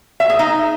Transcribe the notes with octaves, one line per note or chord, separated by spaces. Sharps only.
E5
G#4
D#4